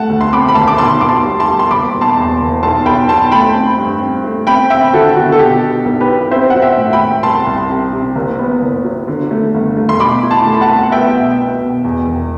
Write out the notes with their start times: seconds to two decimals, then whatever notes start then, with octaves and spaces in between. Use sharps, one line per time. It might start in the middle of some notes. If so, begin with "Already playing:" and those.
Already playing: G2 A3 F#5 A5
0.10 D2
0.21 C6
0.32 C4 B5 D6
0.49 B5
0.55 D2 A5 C6
0.68 D6
0.78 B1 A5 C6
1.01 B1 D6
1.09 A5 C6
1.24 G3
1.40 A5 C6
1.48 G3
1.59 C6
1.71 F#1 B5 D6
1.94 B2
2.01 A5 C6
2.17 E2
2.40 F#1
2.63 B1 A5 C6
2.86 B1 G5 B5
3.09 B1 A5 C6
3.32 A3 G5 B5
3.55 C4
3.78 G2
4.01 C4
4.24 A3
4.47 C4 G5 B5
4.70 C4 E5 G5
4.93 D3 F#4 A4
5.16 D3 F#4
5.32 A4
5.39 B2 G4
5.62 B2
5.85 B1
6.01 G4 B4
6.08 E4
6.31 C4 C5 E5
6.50 F#3 F#5
6.62 E5 G5
6.77 A2
6.93 G5 B5
7.00 A2
7.23 C2 A5 C6
7.47 C2
7.70 C3
7.93 C3
8.15 F#1
8.39 B3
8.62 F#1
8.84 F#3
9.08 D3
9.31 A3
9.54 G1
9.77 A3
9.89 C6
10.00 B2 B5 D6
10.23 E4
10.31 A5 C6
10.46 A3
10.54 B5
10.61 F#5 A5
10.69 C2
10.83 F#5
10.92 B3 E5 G5
11.15 B2
11.38 B3
11.61 B2
11.84 E2
12.07 E1